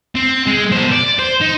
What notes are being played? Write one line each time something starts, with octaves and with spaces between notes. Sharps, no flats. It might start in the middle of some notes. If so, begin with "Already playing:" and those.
C4
G#3
B2 C5
D5
C5
D#4